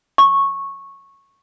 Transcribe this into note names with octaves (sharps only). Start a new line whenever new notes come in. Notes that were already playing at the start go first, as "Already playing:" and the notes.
C#6